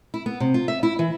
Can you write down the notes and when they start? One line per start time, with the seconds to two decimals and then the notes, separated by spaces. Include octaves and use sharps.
0.14 E4
0.26 B3
0.40 C3
0.54 F4
0.68 E5
0.83 E4
0.99 E3